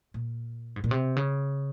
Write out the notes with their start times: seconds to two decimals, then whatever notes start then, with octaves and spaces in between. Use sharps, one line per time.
0.14 A#2
0.76 G#2
0.84 A#2
0.91 C3
1.16 C#3